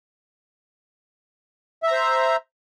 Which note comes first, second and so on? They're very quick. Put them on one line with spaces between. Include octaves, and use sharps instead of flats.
E5 A#5 C5